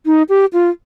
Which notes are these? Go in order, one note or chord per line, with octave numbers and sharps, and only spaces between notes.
D#4
G4
F4